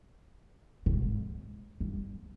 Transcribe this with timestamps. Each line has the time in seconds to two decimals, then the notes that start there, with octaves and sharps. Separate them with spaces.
0.86 B2
0.93 G#2
1.80 G2